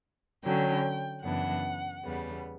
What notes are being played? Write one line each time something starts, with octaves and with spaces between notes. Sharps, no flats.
D3 F#3 C#4 G5
F#2 C#3 E3 B3 D4 F#5
E2 C#3 G3 B3